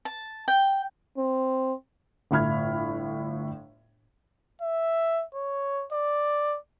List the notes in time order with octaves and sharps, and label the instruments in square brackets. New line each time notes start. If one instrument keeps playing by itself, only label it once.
[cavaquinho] A5
G5
[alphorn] C4
[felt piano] G1 A2 E4 B5 F6 G#6
[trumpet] E5
C#5
D5